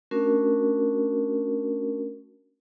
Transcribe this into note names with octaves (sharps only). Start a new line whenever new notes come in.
A3 C#4 D4 F#4 A#4